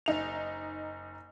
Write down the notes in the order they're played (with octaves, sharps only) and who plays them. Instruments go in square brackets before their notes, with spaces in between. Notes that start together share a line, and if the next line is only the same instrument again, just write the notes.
[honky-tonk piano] F#1 D#4 F7